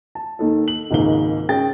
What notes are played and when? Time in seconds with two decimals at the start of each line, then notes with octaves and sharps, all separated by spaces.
0.15 A5
0.39 D#2 D#3 A4
0.68 F#7
0.91 G#1 C#2 G#2 A#3 G7
1.49 C#4 G#4 G5 A6